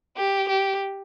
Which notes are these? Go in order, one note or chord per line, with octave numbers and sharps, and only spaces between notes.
G4
G4